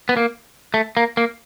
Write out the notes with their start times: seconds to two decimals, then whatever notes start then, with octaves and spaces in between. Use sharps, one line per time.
0.09 B3
0.17 A#3
0.74 A3
0.97 A#3
1.17 A#3